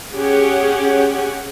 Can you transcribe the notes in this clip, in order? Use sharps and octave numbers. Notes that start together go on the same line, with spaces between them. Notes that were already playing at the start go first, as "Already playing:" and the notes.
C#4 G4 G#4 C#5 F#5